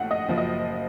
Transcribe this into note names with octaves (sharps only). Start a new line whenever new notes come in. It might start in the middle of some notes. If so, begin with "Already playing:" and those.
Already playing: A#1 A2 F#5
D#5
F#1 F3
D#5